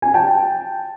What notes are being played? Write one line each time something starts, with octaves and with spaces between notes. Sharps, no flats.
G#5
G5 A5